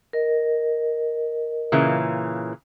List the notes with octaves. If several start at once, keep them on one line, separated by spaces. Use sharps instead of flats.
A#4 D#5
A#2 C#3 E3